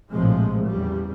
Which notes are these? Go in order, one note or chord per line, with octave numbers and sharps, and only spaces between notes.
A#1 A2 C3 F3 G#3
E2 C#3 G3